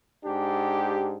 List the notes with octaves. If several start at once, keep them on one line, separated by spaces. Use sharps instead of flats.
G#2 D4 G4